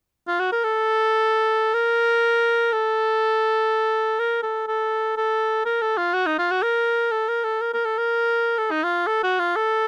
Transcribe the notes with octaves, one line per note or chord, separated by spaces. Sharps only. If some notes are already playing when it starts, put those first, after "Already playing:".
F4
F#4
A#4
A4
A#4
A4
A#4
A4
A4
A4
A#4
A4
F4
F#4
D#4
F4
F#4
A#4
A4
A#4
A4
A#4
A#4
A4
A#4
A4
D#4
F4
A4
F#4
F4
A4